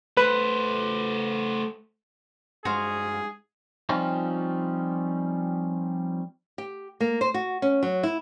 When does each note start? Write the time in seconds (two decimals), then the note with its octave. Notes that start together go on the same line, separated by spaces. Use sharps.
0.17 A3 B4 C5
2.65 G2 G#3 F#4 G#4 C5 F5
3.89 F3 G3 C4 C#4 D#4 F4
6.58 G4
7.00 A#3
7.21 C5
7.34 F#4
7.62 C#4
7.83 F#3
8.03 E4